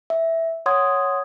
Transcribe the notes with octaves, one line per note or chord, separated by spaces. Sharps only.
E5
C#5 F#5 C6 D#6 G#6